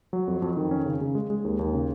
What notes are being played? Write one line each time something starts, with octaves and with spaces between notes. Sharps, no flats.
F#3
F2
F2
D#3
C#4
C#3
C#3
G#3
G#3
D#2
D#2
C#3